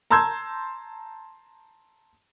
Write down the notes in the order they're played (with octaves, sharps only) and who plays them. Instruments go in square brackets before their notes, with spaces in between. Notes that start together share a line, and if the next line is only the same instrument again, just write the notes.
[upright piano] A5 A#5 C6 E6 G6 G#6